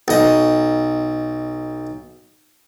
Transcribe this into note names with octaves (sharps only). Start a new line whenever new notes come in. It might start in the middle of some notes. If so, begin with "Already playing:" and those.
B1 D#5